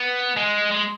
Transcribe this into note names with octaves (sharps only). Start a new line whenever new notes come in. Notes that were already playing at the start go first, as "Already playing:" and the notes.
Already playing: B3
G#3
G#3